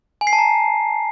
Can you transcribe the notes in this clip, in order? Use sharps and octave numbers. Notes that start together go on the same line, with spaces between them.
G#5
C7
A5
A#5